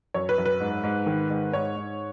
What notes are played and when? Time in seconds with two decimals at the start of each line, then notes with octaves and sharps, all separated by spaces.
0.14 F#2 C#5
0.29 B4
0.38 F#2
0.45 B4
0.60 G#2
0.84 G#2
1.06 D#3
1.30 G#2
1.53 G#2 C#5
1.76 G#2